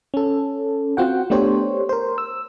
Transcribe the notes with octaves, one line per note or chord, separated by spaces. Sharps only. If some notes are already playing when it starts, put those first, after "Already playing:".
C#4 A4
C4 F4 F#4 F#5 G5
A3 B3 D4 G4 C5 C#5
A#4 C5
E6